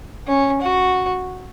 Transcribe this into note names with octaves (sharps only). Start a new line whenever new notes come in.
C#4
F#4